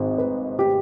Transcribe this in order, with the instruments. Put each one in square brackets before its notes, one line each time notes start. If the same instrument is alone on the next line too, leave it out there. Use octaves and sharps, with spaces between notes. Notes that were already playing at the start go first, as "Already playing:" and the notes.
Already playing: [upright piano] G#1 G#2 D#3 C5
B4
G4